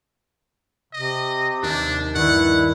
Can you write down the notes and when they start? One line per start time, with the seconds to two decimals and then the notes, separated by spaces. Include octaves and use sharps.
0.93 C3 D#5
1.63 D#2 D4
2.15 G2 D#3 E4 F#5